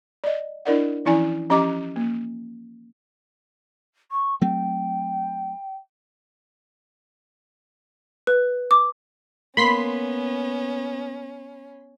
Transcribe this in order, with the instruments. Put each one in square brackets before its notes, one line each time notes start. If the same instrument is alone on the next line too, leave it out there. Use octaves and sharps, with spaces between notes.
[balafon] D5 D#5
D4 E4 A#4 D5 D#5 F#5
E3 F3 C#4 E4 D5 G#5
F3 C#4 G4 D#5 A#5 D6
A#3
[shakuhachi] C#6
[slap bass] F#3 A3 C4 [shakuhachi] G5
[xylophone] B4
D6
[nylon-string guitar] A#3 [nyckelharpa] B3 [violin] C#4 [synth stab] B5 C6 B6